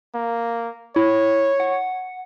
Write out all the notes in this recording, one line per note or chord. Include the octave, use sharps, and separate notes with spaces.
A#3
E4 C#5
F#5